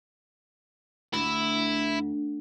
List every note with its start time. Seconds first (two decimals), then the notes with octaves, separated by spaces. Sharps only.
1.14 D2 E4